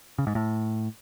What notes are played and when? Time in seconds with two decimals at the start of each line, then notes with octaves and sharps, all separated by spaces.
0.18 C#3
0.27 G#2
0.35 A2